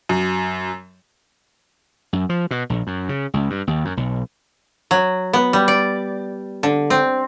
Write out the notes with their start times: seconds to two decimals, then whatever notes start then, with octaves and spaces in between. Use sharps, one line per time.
0.09 F#2
2.13 F#2
2.29 F3
2.51 B2
2.70 A#1
2.87 F#2
3.09 C#3
3.34 C#2
3.50 G2
3.67 D#2
3.85 F#2
3.97 B1
4.91 F#3
5.33 B3
5.53 G3
5.68 D5
6.63 D3
6.90 C4